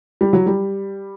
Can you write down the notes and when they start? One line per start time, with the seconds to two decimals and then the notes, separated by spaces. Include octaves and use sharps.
0.21 G3
0.33 F#3
0.46 G3